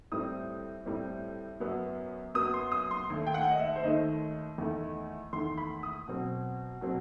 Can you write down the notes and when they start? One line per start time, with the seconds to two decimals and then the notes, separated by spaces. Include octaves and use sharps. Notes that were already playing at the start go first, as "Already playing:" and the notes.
0.12 A2 G3 C4 D#6
0.86 A2 G3 C4
1.60 F#2 F#3 B3
2.34 F#2 F#3 B3 D#6
2.54 C6
2.72 D#6
2.91 C6
3.10 D#2 D#3 A3
3.27 G5
3.34 F#5
3.51 D#5
3.59 E5
3.76 C5
3.84 D#2 D#3 A3 D#5
4.58 E2 D#3 A3
5.33 E2 D#3 A3 C6
5.58 B5
5.83 D#6
6.08 B2 F#3 C4
6.81 B2 F#3 C4